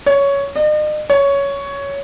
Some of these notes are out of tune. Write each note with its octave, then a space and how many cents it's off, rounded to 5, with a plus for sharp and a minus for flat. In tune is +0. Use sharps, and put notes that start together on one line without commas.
C#5 +10
D#5 -45
C#5 +10